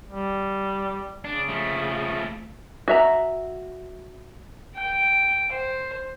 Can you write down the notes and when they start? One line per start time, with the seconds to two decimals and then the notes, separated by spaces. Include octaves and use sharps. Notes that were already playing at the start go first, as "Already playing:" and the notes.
0.10 G3
1.24 C#3 D4
1.49 F3 A3
2.88 F#4 E5 A#5
4.76 G5
5.52 C5